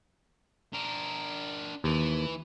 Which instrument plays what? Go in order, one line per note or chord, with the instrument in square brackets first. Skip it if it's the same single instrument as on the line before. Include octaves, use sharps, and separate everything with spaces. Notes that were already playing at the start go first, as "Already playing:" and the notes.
[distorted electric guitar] D4 A#4
[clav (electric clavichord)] D#2 [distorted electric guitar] E3